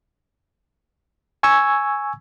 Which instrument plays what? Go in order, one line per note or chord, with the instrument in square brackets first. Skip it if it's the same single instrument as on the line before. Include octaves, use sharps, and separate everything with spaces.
[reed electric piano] G#5 C#6 E6 G#6